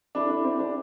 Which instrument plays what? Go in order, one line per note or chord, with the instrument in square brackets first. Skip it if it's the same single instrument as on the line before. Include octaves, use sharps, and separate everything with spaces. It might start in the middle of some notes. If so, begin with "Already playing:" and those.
[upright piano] D4 [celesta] E4 A4 E5 B5 D6
[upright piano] D4
C4
D4